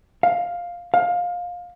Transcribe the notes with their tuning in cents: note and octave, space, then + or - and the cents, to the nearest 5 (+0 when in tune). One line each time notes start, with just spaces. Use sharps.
F5 +5
F5 +20